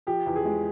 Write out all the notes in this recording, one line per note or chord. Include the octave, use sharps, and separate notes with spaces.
F3 G4
E2
G#4
G#3